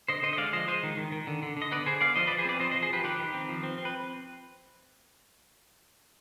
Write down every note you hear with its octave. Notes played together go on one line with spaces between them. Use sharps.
D3 C5 D#5
D3 C5 D#5
D#5
G#3 D5 F5
F3 C5 D#5
G#3 C5 D#5
D#3
D#3
D#3
D3
D3
D3
D#5
B3 B4 D5
D3 G#4 C5
B3 D5 F5
F3 C5 D#5
B4 D5
F3
G#4 C5
C4 B4 D5
F3 C5 D#5
C5 D#5
F3
G#4 C5
F3 G4 B4
D#3 G4 B4
D#3
C4
F3
C4
C4
B4